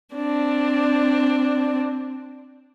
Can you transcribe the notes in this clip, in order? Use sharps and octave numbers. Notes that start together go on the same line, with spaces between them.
C4 D4